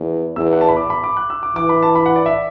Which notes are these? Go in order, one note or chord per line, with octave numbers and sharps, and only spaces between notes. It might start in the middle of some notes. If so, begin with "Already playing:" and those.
Already playing: E2
E2 E6
F#5
A5
B5
D6
B5
D6
F#6
E6
D6
E3 D6
B5
A5
B5
F#5
D5
E5